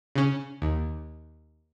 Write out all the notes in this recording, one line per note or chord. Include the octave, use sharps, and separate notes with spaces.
C#3 C#4
D#2